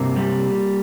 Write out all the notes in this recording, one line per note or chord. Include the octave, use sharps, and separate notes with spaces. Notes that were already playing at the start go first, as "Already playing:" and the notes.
Already playing: G2 C3 A#3
G3